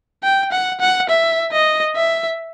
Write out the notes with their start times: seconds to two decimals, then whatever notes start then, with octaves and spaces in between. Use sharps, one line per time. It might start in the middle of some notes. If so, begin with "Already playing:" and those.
0.23 G5
0.52 F#5
0.81 F#5
1.10 E5
1.52 D#5
1.96 E5